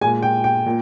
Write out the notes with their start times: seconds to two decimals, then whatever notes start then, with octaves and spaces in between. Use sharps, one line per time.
0.01 A#2 G#3 G#5
0.23 G5
0.44 G5
0.66 A#2